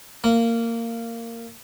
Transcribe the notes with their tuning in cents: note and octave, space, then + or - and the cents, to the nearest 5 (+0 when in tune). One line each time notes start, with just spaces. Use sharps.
A#3 -15